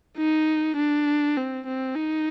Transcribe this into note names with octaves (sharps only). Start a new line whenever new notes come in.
D#4
D4
C4
C4
D#4